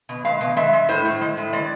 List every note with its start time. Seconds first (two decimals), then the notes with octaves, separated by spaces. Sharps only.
0.09 B2
0.25 G#3 F5
0.41 B2
0.56 G#3 E5
0.73 G#3
0.89 A2 C5
1.05 A2
1.21 G#3
1.37 A2
1.53 G#3 D5